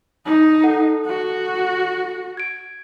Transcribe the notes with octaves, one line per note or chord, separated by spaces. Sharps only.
D#4
A4 F#5
F#4
G#6 D7